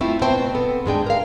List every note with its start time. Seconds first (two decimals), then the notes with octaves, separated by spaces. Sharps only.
0.01 A3 C4 E4 F4
0.22 B2 C4 C5 G5 A5
0.55 B3 A4
0.86 G#2 G#3 D4 G5
1.06 A#4 F5